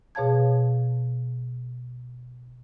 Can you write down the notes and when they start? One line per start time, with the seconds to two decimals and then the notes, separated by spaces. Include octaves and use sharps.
0.15 B2 G#4 C#5 F5 A5 G#6